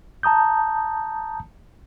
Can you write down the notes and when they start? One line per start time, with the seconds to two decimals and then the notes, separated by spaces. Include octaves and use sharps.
0.23 A5 A#5 D#6 G6